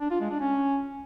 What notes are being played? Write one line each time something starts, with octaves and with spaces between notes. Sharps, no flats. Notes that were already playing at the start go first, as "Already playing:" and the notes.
D4
F4
G#3
D4
C#4